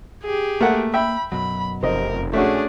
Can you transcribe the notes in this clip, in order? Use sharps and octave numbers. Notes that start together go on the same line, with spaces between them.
G4 G#4
A3 A#3 A#4 F#5
E5 G5 B5
F#2 B2 F#3 B5
F1 C4 A#4 D#5
A#1 A3 C#4 D4 F#4 G#4